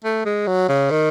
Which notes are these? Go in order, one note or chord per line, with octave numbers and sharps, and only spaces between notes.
A3
G#3
F#3
C#3
D#3